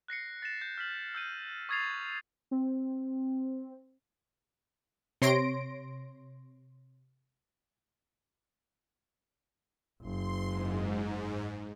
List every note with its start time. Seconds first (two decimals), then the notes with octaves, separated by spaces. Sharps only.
0.08 F#6 A#6 C7 C#7
0.42 A6 A#6 E7
0.62 G6
0.78 F6 B6 F#7
1.15 E6 G6 D#7
1.69 C#6 D#6 G#6 A6 C7 F7
2.51 C4
5.22 C3 C#5 C6 A#6 D7
10.02 F#1 C6
10.45 G#2